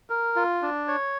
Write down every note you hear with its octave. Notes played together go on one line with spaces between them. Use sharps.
A#4
F4
D4
C#5